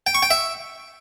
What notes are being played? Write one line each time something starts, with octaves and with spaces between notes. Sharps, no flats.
G5
C#6
G5
E5